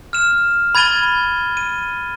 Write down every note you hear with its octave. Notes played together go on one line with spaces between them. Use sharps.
F6 E7
B5 G#6 A6 D#7 G7
D#7